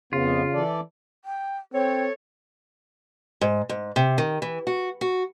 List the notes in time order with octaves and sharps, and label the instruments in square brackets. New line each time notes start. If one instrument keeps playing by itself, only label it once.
[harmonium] F2 B3 [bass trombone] C#3 [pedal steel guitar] F4
[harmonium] E3 A4 D5
[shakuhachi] G5
[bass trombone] C4 [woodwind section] A4 C#5 [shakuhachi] G5
[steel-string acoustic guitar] G#2
G#2
C3
D#3
E3
F#4
F#4